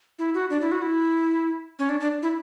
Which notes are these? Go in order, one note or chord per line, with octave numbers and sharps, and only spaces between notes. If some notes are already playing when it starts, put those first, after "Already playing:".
E4
F#4
D4
E4
F#4
E4
C#4
D4
D4
E4